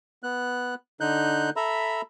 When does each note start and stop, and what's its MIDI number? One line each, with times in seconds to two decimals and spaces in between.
0.23 0.74 59
0.23 0.74 90
1.01 1.50 50
1.01 1.50 63
1.01 1.50 90
1.01 1.50 91
1.56 2.01 69
1.56 2.01 76
1.56 2.01 82
1.56 2.01 83